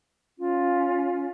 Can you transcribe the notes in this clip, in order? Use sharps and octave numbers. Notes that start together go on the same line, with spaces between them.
C#4 F4